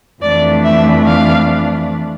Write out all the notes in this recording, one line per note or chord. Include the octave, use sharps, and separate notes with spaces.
F2 E3 A3 D4 D5
E5
F5